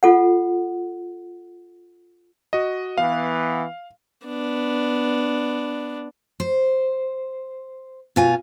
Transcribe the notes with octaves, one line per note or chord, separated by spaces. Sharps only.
F4 A4 F#5
F#4 D#5
E3 B3 F5
B3 D4
C5
B2 F4 G#5